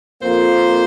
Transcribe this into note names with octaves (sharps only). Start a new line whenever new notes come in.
F2 F3 A#3 C5